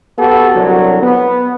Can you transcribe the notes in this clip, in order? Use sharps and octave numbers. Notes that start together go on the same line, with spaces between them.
B3 F#4 G4 A4
C2 D3 F#3
B3